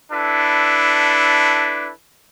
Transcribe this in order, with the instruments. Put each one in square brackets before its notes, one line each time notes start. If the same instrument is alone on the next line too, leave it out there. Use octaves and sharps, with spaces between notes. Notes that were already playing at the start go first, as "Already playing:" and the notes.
[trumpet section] D4 E4 A4 B4